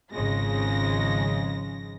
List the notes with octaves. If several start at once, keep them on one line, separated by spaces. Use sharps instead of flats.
G#1 C#3 F3 G#3 A#6